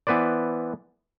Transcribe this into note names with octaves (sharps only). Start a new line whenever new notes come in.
E3 B3 B4 C5 D5